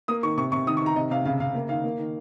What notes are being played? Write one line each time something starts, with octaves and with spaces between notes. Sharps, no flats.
A#3 D#6
D#3 C#6
C3 C#6
C3 C#6
D#3 D#6
C#6
D#3 A#5
C3 D#5
C3 F5
C#3 F5
C#3 F5
A#3
D#3 F5
A#3
D#3